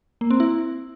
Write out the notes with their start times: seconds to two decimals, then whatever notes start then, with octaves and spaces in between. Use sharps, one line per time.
0.21 A#3
0.30 C4
0.40 E4